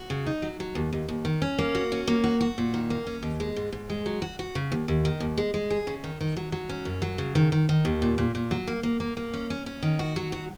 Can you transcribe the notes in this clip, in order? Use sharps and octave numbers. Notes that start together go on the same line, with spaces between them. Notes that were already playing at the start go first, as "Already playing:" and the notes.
Already playing: F#4
C#3
D#4
F#3
F#3
D#2
D#2
D#2
D#3
C#4
A#3
F#4
C#4
A#3
F#4
F#4
A#2
D#3
A#3
C#4
D#2
G#3
G#2
G#2
G#3
F#3
F#4
F#4
C#3
D#2
D#2
D#3
D#2
G#3
G#3
G#4
C#3
D#3
D#3
F#3
F#3
C#4
F#2
F#3
C#3
D#3
D#3
D#3
D#2
A#2
A#2
A#2
F#3
A#3
A#3
A#3
A#3
C#4
C#4
C#4
D#3
F#4
F#3
F#4